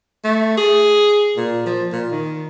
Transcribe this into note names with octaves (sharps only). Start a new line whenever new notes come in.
A3
G#4
A#2
F3
A#2
D#3